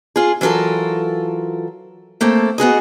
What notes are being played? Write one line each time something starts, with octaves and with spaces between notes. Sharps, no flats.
F4 G#4
E3 F#3 F4 A4 A#4
A3 A#3 C4 A4
B3 F#4 G#4 D#5